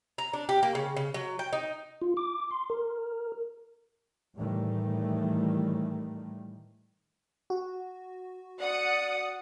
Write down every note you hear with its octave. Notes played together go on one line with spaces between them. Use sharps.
A#5
D4
G4
A#3
C#3
C#3
F#3
G5
D#4
F4
D6
C6
A#4
A2 D#3 E3 G3 A3
F#4
D5 F#5 D#6 C#7